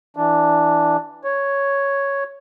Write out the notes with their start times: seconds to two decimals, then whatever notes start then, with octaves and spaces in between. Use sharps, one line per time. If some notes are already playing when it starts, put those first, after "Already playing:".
0.17 E3 D4
1.24 C#5